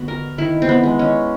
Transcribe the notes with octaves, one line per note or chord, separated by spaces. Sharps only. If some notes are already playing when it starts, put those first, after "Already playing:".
Already playing: D3 B3 F#4
A#4
D#3 E4
C4
B3
G#3
C#4